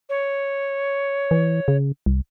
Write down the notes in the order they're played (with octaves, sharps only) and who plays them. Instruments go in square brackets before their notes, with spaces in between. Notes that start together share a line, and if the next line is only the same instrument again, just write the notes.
[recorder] C#5
[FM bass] E3
C#3
C2